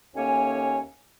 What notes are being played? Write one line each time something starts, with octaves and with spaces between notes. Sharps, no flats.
D#2 A3 A#3 C#4 C#5 G#5